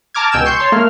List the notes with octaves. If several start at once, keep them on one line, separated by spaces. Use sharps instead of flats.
A5 A#5 D6 F6 G#6
C#2 B2 G5 G#5 E6 E7
C6 C#6 G6
C#5 A5 C6
A3 A#3 F6